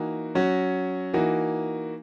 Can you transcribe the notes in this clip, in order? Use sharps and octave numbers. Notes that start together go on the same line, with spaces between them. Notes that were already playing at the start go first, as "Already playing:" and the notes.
Already playing: E3 A#3 D#4 F#4
F#3 C#4 F#4
E3 A#3 D#4 F#4